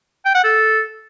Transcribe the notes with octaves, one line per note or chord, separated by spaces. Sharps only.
G5
F#5
A4